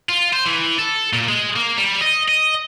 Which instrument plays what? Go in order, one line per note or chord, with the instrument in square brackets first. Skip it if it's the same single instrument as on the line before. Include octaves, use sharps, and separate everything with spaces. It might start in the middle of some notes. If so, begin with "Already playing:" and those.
[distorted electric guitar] F4
C5
E3
A4
A#2
G#3
A#3
G3
D#5
D#5